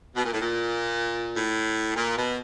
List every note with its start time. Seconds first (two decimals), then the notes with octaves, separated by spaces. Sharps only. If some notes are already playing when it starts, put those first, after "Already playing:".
0.16 B2
0.24 A#2
0.32 A2
0.41 A#2
1.35 A2
1.95 A#2
2.16 B2